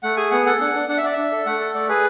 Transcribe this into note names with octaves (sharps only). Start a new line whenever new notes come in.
A3 F#5
G#4 G#5
B3 F#5
A4 F#5
D4 F#5
D4
D4 F#5
E5
D4 D5
D4 E5
A4
A3 F#5
A4
A3 D5
G#4 B4